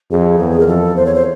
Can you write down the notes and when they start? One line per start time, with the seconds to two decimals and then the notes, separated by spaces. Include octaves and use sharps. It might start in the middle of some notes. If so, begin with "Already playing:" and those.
0.10 F2 G#4
0.39 E2
0.59 A#4
0.67 F2 A4
0.95 E2 C5
1.05 C#5
1.14 C5